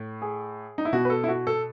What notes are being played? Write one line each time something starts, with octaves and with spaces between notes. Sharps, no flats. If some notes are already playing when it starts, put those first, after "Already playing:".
Already playing: A2
G#4
D#4
E4
B2 F#4
B4
A4
E4
F#4
A4